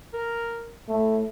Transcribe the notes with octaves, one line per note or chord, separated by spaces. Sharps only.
A#4
A2 A3